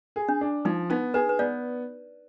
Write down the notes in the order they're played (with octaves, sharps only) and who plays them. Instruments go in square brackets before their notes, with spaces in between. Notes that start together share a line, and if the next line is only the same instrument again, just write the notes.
[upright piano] G#4
[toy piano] D4
[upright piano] D4
[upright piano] F3 [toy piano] D#4
[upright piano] B3 [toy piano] D#4
[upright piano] G#4 [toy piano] B4
[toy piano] B4
[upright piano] B3 [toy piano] D5